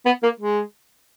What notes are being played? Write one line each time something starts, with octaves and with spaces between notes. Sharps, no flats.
B3
A#3
G#3